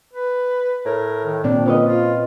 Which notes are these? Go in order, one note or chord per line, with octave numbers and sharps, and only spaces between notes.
B4
A2 A#4
D#3
A#2 C4 D4
D3 F3 C#4 B4 D#5
F4